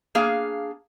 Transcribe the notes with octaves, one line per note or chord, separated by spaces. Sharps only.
A#3 D4 G#4 F5